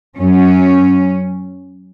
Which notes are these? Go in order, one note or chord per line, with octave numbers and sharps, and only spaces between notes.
F#2 F#3 C#4